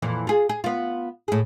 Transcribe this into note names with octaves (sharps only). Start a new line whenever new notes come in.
F2 A#2 E3
F4 G#4
G#4
B3 F4
A2 G#4